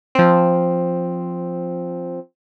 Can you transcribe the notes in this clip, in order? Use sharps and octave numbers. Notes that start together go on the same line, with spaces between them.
F3 C4